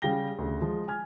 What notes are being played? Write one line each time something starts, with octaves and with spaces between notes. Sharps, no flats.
C#3 G3 F5 G5 A#6 G7
D2 C#3
F3 G#3
G#5 F6 G#6